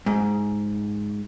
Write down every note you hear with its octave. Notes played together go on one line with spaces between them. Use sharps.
G#2